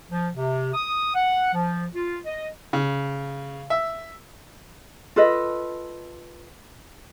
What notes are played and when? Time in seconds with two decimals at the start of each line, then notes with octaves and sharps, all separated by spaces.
0.10 F3
0.35 C3
0.74 D#6
1.15 F#5
1.53 F3
1.93 F4
2.26 D#5
2.73 C#3
3.70 E5
5.16 F4 A4 B4 D#5